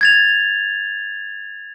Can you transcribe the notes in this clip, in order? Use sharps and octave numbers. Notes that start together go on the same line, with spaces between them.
G#6 A6 F7